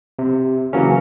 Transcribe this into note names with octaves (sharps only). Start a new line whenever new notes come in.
C3
C#3 E3 F#3 A#3 C#4